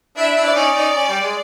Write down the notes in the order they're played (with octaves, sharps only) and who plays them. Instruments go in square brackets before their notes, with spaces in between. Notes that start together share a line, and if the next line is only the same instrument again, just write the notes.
[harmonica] D4 E4 [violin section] E5
[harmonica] D4 E4
[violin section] D5
[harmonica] C#4 D#4
C#4 D#4
C#4
G3
G#3